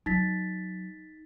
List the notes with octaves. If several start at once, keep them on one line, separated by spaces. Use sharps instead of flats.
F#3 D#4 A6 B6